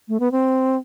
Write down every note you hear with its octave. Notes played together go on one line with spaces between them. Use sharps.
A3
B3
C4